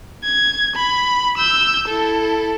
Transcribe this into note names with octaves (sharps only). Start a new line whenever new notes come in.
G#6
B5
E6 G6
E4 A4